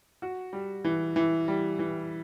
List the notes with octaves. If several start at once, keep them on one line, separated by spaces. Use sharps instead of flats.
F#4
G3
E3
E3
G3
E3